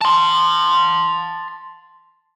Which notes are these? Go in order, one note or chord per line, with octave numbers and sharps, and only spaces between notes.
A5 C6